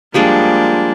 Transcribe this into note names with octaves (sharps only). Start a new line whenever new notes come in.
F3 G3 G#3 A#3 D4